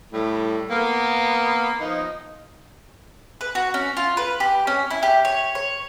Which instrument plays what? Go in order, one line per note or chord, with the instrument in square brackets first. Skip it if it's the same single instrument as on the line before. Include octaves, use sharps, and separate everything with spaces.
[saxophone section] A2 G3
A#3 B3
F3 D#4
[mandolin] B4
F#4
C#4
F4
B4
G4
C#4
E4
G4
C#5
C#5